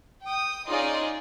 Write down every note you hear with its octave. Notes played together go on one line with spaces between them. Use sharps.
G5 D#6
C#4 D#4 F4 G#4 D5 D#5